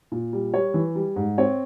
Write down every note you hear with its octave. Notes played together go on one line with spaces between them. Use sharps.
A#2
G3
G3 C#5
E3
G3
G#2
C4 C#5